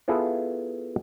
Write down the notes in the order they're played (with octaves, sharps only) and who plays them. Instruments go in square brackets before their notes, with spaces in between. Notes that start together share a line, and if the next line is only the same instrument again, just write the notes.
[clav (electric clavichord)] B3 E4 F4 G#4 A4